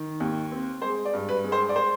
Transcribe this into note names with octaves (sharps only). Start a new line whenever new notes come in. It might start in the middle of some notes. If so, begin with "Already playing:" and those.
Already playing: D#3
D#2
C4
G#3 C5
D5
G2
B4
G#3
C5
D5
C5